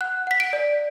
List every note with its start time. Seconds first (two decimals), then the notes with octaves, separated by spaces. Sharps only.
0.01 F#5 F#6
0.27 F#5 B6
0.40 D7
0.53 D5